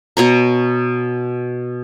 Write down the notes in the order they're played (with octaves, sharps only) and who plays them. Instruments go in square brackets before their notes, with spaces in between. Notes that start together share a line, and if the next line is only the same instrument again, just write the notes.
[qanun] B2 C#5 A#5